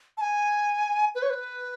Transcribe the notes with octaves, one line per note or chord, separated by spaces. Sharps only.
A5
G#5
B4
C#5
B4